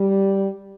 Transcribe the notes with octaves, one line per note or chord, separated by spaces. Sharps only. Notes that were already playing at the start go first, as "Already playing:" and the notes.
Already playing: G3